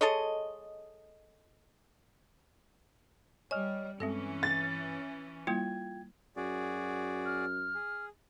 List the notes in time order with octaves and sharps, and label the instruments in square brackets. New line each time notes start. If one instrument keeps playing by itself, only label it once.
[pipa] G#3 A4 C#5 D#5
[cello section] G3 [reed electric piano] C#5 D#5 F6 [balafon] G#5
[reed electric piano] G2 [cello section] E3 C#4 [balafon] G#3 C4 A4
[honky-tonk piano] A6
[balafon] G3 A#3 E4 [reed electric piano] F4 G5 G#6
[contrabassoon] F#2 [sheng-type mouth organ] F#4 G#4 D5
[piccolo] F6
[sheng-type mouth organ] G#4